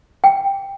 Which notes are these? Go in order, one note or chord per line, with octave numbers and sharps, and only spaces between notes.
G5